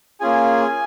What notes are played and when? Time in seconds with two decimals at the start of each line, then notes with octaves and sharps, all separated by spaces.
0.21 A#3 C#4 F4 G#4 G#5